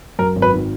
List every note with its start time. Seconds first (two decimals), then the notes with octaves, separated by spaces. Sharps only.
0.19 F#2 A#4
0.36 G#1
0.42 B4
0.54 D#3